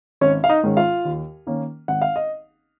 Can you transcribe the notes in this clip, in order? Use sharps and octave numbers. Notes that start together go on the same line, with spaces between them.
G#1 C#4 C#5
F5
D#4 D#5
G#2 D#3 G#3 C#4
F4 F5
D#2
D#3 A#3 C#4
G#1 F#5
F5
D#5